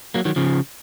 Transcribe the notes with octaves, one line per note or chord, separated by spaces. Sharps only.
F#3 A#3
D#3 F#3
C#3 F3